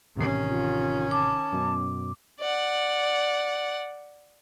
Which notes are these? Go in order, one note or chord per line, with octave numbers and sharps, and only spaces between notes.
A1 C3 D#3 C#4 C7
F4
A5 D6
F#2 B2
D5 F#5